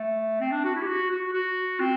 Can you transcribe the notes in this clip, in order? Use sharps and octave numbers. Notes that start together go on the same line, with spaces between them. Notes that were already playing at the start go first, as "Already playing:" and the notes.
Already playing: A3
C4
D4
F#4
E4
G4
F#4
F#4
F#4
C4